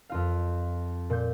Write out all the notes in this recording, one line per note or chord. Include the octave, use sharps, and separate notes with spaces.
F2 F4 F5
A#2 G6